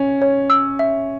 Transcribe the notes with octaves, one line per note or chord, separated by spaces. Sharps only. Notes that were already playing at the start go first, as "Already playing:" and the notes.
Already playing: C#4
C#5
E6
E5